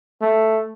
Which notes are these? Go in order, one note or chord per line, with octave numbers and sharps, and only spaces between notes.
A3